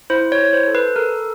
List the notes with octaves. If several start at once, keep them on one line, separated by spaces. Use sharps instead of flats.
E4 C5
C#5
E4
C5
A4
B4
A4 A#4